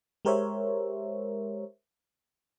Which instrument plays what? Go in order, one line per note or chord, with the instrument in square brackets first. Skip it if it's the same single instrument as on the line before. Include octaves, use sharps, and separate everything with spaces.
[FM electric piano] G#3 G4 A#4 C5 C#5 E5